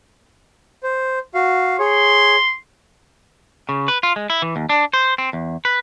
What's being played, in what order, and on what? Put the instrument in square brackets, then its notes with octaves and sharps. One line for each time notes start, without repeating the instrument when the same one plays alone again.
[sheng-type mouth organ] C5
F#4 F5
[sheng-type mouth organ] G#4 C#5 [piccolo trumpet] C6
[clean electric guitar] C#3
B4
F4
G#3
E4
E3
D#2
D4
C5
C4
E2
B4